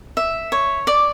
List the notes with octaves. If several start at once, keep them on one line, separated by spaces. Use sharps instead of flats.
E5
C#5
D5